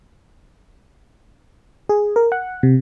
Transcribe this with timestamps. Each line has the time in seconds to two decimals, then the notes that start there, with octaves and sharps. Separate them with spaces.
1.89 G#4
2.16 A#4
2.32 F#5
2.63 C3